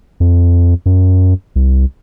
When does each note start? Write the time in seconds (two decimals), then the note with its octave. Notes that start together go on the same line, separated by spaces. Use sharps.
0.20 F2
0.86 F#2
1.56 C2